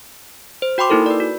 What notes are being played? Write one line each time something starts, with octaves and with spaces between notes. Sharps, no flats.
C5
F#4 G5 B5 C6 D6
A#3 D#4 E4 A4 A#4
B4 D5
F#4